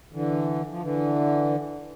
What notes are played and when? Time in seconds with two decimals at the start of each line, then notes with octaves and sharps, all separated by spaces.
0.13 D3 E3
0.70 F3
0.82 D3 E3